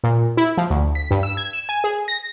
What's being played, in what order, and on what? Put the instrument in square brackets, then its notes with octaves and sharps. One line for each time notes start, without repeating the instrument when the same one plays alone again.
[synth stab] A#2
E4
F3
D2
B6
G2
E6
G#6
E7
G#5
G#4
A#6